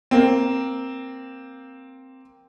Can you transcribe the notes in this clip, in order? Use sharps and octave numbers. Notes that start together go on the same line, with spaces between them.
A#3 C4